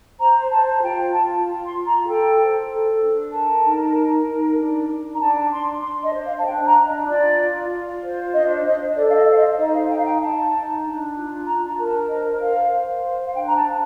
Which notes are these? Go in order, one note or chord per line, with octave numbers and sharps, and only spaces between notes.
C5 A#5
C5 A5
F4 G5
F4 A5
F4
C6
F4
A#5
A4 G5
C5
A4
D4
A#4 A5
D#4
A#4
D#4
D4
D4
A#5
D4 A5
D4 C6
D4 C6
D#5
C5
F5
A5
D4 G5
A#5
D4
D#5
F4 D5
F4
F4
C5
D4 D#5
D4 D#5
A4 D5
F5
D#5
C5 F5
D#5
D#4 D#5
F5
D#4 G5
F5
G5
D#4 A5
D#4
D4
F4
D4 A#5
A#5
A#4
A5
C5 D#5
C5 F5
C5
C5
F5
D4 G5
A#5
A5
D4